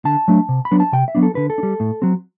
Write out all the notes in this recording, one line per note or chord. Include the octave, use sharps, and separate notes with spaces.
D3 A5
F#3 A3 D4
C3
B5
F#3 B3 D4
A5
C3 G5
E5
F#3 B3 D4
A4
D3 B4
A4
D4
G3
A2
F#3 C4